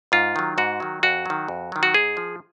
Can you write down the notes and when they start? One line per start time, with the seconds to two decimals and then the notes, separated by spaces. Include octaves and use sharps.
0.12 G#2 F4
0.36 D#3 F#3
0.58 G#2 F#4
0.80 D#3 F#3
1.03 F2 F#4
1.26 D#3 F#3
1.48 F2
1.72 D#3 F#3
1.83 F#4
1.94 G#2 G#4
2.17 F3